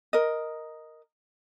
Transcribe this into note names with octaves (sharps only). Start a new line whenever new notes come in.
A#4 D#5